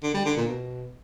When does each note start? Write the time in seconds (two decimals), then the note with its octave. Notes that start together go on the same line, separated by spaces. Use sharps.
0.03 D3
0.14 G3
0.25 D3
0.36 A#2
0.48 B2